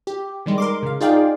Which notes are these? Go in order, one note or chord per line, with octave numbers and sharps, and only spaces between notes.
G4
D#3 G3 G#3
A#4 C6 D6
C#3 F5
D#4 F4 G#4 D5 F5 G5